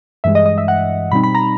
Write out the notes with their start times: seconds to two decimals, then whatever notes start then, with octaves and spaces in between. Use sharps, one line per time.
0.24 G2 E3 G#3 E5
0.35 D#5
0.46 D#5
0.58 E5
0.68 F#5
1.11 B2 G3 C4 D#4 B5
1.24 B5
1.35 A#5